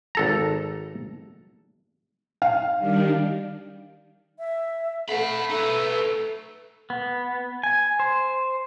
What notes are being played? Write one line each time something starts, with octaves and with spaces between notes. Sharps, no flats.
G#1 A4 A#5
F5
D#3 G3 D4
E5
A3 F5 F#5 B5
D#4 A4 B4
B3
G#5
C5